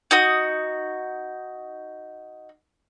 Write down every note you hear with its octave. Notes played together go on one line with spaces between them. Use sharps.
D#4 F#4 D#6